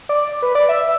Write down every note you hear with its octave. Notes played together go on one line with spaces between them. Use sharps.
D5
B4
D5
E5